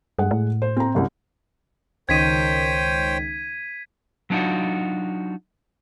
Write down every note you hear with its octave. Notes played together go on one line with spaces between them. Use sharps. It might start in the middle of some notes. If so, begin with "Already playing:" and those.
G2 G#3 F#5
A2
C5
C4 A#5
C2 F#2
C#2 D#3 C5 C#5 G5 G#6 B6 D#7
F#3 B3 D4 D#4 F4 F#4